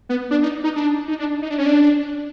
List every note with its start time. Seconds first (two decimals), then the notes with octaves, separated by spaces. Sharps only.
0.09 B3
0.31 D4
0.42 D#4
0.64 D#4
0.76 D4
1.08 D#4
1.19 D4
1.42 D#4
1.50 D4
1.58 C#4
1.66 D4